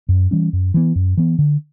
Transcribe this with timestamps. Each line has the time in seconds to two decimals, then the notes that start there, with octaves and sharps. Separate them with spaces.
0.09 F#2
0.31 E3 G3 C#4
0.53 F#2
0.74 E3 B3
0.95 F#2
1.17 E3 B3
1.39 D3